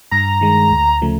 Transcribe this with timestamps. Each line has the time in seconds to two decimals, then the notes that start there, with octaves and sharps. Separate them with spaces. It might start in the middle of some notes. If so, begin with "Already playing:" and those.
0.11 G2 A#5
0.41 D#3 G#3
0.71 D2
1.02 C#3 F3 A3